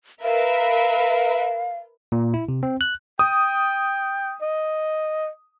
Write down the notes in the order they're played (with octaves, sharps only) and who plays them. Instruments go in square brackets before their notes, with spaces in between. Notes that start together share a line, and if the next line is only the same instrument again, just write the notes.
[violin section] A#4 B4 E5 [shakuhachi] F5
[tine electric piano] A#2
E4
C3
C4
F#6
[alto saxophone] G5 [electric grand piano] D#6
[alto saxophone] D#5